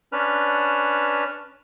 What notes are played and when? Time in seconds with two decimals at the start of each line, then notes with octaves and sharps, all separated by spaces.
0.12 C#4 D4 B4 F6